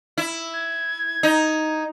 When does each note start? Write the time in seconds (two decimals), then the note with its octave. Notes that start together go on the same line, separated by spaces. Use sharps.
0.18 E4
0.54 G#6
1.23 D#4